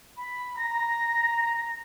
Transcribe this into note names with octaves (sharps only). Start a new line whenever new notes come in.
B5
A#5 A#6